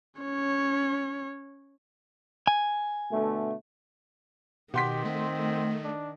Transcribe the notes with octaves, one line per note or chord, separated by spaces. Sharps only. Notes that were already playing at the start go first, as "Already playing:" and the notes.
C#4 C#5
G#5
B2 D3 A3
B2 D#3 G4 F#5 C6 B6
A3 C4
D4